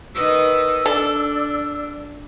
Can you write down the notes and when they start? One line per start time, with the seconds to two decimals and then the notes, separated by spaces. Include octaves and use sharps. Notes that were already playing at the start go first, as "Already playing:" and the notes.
0.15 D#3 B4 D#5 E6
0.86 D4 A4 D5